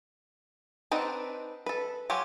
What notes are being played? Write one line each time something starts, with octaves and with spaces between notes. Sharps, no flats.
C4 D4 D#4 B4 F#5
A4 B4
F#3 F4 G4 F#5 G#5